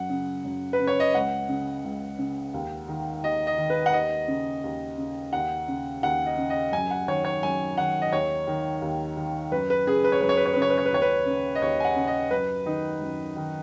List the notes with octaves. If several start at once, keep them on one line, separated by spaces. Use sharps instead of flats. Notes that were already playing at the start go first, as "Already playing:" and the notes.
Already playing: F#2 F#5
C#3
F#2
B4
C#3
C#5
D#5
C#2 F#5
C#3
C#2
C#3
D#2
D#3
D#2 D#5
D#5
D#3
B4
F#5
D#2 D#5
C#3
D#2
C#3
D#2 F#5
C#3
D#2 F#5
D#5
C#3
D#5
F#2 G#5
F#5
D#3 C#5
C#5
F#2 G#5
D#3 F#5
D#5
D#2 C#5
D#3
D#2
D#3
F#2 B4
B4
C#3 G#4
B4
C#5
F#2 B4
C#5
B4
C#5
C#3 B4
C#5
B4
C#5
B4
D#2 C#5
B4
C#3
D#5
D#2 C#5
G#5
F#5
C#3
D#5
F#2 B4
D#3 D#4
F#2
D#3